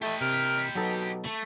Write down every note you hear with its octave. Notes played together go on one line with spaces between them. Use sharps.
A3 G4 D#5
C3 A#4
B2 F#3 D#4 A4
A3